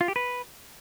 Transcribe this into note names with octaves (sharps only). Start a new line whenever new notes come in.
F4
G4
B4